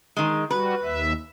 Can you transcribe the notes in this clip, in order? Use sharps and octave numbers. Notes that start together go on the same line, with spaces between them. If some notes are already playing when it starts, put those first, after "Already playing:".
D#3 G#3
G3 F#4 B4
D#2 E5